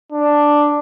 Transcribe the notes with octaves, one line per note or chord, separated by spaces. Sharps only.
D4